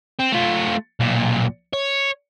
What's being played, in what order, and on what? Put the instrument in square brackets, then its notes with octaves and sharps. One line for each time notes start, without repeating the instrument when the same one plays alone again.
[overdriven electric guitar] C4
A3 F4
B1 A#2
C#5